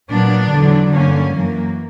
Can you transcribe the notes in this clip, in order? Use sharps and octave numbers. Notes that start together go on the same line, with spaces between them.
A#2 F#3 B3 D4
E2 D3 F#3
G2 D3 F#3 A#3 C#4
F#2 E3 F#3 A#3